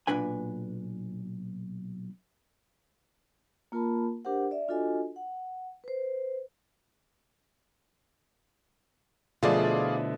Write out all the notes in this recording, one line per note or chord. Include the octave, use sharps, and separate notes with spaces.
B1 G2 A#2 D4 B4 G#5
A#3 F4 A#4 A5 B5
D4 G4 A#4 C5 F#5
D5 E5
D4 F4 F#4 A4 D#5 G#5
F#5
B4 C5
B2 D3 F3 A3 E4 F4 G#4 D5